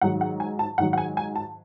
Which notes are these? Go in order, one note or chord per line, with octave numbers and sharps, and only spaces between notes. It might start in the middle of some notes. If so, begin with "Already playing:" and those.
G#2 D#3 F#3 F#5
F#5
G#5
A5
G#2 D#3 F#3 F#5
F#5
G#5
G#5
A5